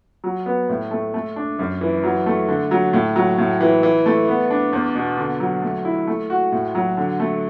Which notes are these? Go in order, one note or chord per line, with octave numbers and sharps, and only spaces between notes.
F#3
B3
A2
A3
A3
D4
F#2
E3
F#3
A3
D3
F#3
A2
F#3
A2
E3
E3
A3
B3
D4
E2
B2
D3
F#3
A3
E4
A3
F#4
A2
F#3
D3
A3